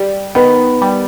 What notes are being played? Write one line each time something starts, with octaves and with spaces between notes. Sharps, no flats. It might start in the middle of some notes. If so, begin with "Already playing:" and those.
Already playing: G3
D#3 B3
G3